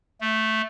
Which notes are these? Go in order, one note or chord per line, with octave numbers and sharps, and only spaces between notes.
A3